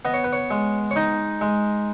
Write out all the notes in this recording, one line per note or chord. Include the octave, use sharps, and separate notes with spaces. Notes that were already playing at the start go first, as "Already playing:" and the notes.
B3 D#5
C#5
B4
C#5
G#3
C#5
D#4 D#5
G#3